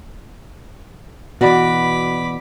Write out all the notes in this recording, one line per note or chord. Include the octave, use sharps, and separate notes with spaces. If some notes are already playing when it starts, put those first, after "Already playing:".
B2 E3 F#4 D5 B5 D6